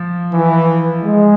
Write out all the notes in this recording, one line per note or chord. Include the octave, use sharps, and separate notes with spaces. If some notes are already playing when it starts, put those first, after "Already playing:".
Already playing: F3
E3
G#3